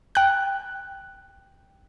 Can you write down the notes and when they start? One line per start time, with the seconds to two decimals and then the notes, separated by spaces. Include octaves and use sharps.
0.15 G5 F#6